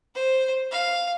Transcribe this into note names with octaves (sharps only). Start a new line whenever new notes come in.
C5
F5